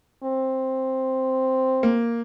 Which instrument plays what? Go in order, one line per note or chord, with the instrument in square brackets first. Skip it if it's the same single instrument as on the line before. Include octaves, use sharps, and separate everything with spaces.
[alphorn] C4
[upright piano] A#3